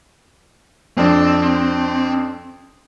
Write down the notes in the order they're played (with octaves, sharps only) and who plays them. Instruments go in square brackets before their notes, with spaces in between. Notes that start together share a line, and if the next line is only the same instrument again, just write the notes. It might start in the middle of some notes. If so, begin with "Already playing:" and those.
[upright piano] F2 D4 [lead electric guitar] C4